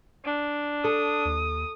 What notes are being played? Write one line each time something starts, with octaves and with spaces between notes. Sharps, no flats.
D4
A4 D#6
D#2